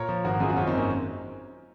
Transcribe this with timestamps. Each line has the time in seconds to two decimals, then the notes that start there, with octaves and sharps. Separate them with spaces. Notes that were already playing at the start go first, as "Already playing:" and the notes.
Already playing: A#2 A#4 C#5
0.09 F3
0.24 G#1 F#4 A#4
0.40 F#2 F4 G#4
0.50 F#4
0.56 G#1 C#4 F4
0.67 C4 D#4
0.73 G#1 A#3 C#4